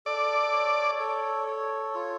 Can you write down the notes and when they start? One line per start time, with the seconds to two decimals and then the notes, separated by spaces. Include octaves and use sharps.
0.06 A4 D5
0.53 C#5
1.00 A4
1.47 C#5
1.95 F4